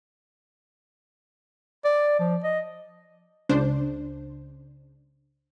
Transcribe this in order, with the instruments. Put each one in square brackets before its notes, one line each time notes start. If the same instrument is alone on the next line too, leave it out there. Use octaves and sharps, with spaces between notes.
[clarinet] D5
F3
D#5
[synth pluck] C#2 C#3 D4 C5